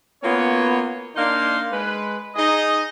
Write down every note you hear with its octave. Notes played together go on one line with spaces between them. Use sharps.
A#3 B3 C#4 F4 F#4 C#5
A#3 D4 D#4 F5 C6
G#3 B4
D#4 G#4 D#5